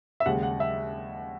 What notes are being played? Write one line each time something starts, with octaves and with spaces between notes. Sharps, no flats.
E5
D#2 C#3 G#3 F#5
F#5
E5